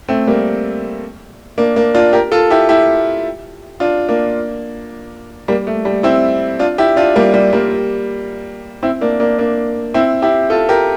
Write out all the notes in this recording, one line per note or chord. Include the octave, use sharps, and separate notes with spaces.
A3 C4
G3 A#3
A#3 D4
A#3 D4
D4 F4
G4 A#4
F4 A4
E4 G4
E4 G4
D4 F4
A#3 D4
G3 A#3
A3
G3
C4 E4
D4 F4
E4 G4
D4 F4
G3 A#3
G3
G3 A#3
C4 E4
A#3 D4
A#3 D4
A#3 D4
C4 E4
E4 G4
F4 A4
G4 A#4